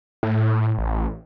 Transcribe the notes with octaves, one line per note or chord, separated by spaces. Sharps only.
A2
A1